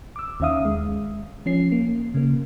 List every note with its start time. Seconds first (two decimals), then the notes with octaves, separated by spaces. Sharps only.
0.16 D6 E6
0.40 D#2 D#3 C#4 E5 F5 D#6
0.65 G#3
1.46 F3 C#4 C7
1.72 A#3
2.14 C#3 A#3